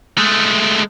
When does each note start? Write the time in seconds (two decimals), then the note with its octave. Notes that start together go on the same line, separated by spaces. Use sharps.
0.18 G#3 A3